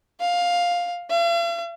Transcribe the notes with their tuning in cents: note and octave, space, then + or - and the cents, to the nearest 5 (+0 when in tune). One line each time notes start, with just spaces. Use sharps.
F5 +10
F5 -45